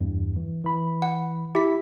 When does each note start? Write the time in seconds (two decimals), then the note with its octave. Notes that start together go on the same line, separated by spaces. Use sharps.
0.01 E2 G2
0.36 E3
0.64 E3 B5
1.02 F#5
1.55 E4 G4 B6